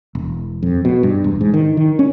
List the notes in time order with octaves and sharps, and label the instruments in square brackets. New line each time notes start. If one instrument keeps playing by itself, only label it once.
[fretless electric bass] E1
F2
B2
G2
E1
G#2
D#3
D#3
C#4